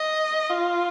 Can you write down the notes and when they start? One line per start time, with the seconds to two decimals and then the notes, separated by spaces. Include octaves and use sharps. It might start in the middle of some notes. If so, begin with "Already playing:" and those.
Already playing: D#5
0.50 F4